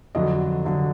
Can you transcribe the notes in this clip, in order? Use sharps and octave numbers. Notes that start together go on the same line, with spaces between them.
F2 D3 F#3 D#5
D3 F#3